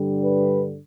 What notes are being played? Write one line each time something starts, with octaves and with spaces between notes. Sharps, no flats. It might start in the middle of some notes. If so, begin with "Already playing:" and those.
Already playing: G2 D3 G3
B4